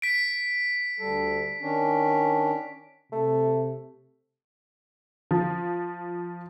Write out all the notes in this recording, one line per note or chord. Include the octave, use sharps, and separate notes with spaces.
B6 D7
D2 G3 A4
D#3 C#4 D4
C3 A3
F3